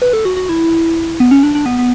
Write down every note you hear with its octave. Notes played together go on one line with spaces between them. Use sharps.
B4
A4
F#4
F#4
E4
B3
C#4
D4
D4
B3
B3